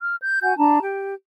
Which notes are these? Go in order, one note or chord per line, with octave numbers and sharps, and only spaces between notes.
F6
G6
F#4 F#5 G#5 G6
D4 A5 A#5
G4